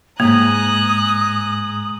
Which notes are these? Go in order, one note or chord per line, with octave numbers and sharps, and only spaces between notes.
C2 G#2 A#3 G#5 A#5 D#6 F#6